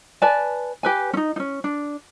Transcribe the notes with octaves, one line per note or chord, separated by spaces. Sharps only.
B4 D5 G#5 A5
G4 B4 G#5
C#4 D#4
C#4 D#4
D4